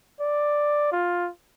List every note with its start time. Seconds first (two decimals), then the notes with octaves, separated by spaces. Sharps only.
0.20 D5
0.92 F4